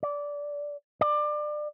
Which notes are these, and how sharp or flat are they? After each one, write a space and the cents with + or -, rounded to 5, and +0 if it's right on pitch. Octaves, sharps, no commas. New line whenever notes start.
D5 -15
D5 +25